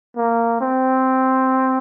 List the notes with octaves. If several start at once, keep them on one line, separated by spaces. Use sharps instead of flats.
A#3
C4